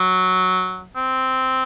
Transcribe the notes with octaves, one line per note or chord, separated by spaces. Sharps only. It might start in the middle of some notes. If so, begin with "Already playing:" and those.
Already playing: F#3
C4